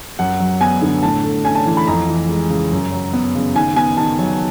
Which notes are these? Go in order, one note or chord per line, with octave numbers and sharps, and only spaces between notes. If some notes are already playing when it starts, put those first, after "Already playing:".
F#2 F#5
F#3
B3 G#5
D3
A2 A5
A3
C#4 G#5
A5
E3
B5
F2 A#5
E3
G#3
C#3
F#2
F#3
B3
C#3
D#3 G#5
B3 G#5
D#3 A5
F#3